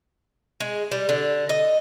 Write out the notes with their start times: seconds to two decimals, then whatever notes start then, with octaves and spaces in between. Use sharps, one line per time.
0.60 G#3
0.91 G3
1.09 D3
1.49 D#5